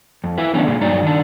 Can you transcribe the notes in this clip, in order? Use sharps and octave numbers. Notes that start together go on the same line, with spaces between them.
F2
E4 B4
D3 E3 B3 C#4 D4
A#2 G#3
G2 F#3 D#4 D5
D#3 D4